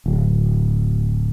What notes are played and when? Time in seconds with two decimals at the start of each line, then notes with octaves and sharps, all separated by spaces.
0.06 D1